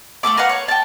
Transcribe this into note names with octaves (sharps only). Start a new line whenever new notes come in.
A3 A#3 A4 D6
A#4 B4 F5 F#5
C#5
G5 A5